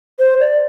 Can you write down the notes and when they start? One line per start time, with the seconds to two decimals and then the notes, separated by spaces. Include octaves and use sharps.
0.19 C5
0.40 D5